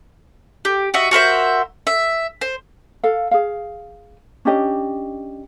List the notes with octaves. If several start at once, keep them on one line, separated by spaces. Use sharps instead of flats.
G4
F#4 D#5 E5
F#4 A#4 C5 E5
E5
C5
A4 F5
G#4 F5
C#4 D4 G4 D#5